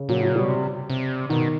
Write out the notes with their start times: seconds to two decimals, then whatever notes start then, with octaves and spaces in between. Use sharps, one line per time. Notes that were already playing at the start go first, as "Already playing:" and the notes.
Already playing: C#3
0.09 A#2 F#3
0.20 A2 F#3
0.30 A#2
0.36 B2 G3
0.49 C3
0.90 C3
1.30 B2 D#3